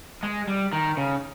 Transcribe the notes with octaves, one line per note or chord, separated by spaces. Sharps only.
G#3
G3
D#3
C#3